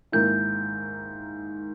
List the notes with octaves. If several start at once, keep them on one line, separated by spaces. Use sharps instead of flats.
G#2 D#3 A#3 E4 G6